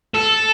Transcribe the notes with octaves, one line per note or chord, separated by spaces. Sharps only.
A4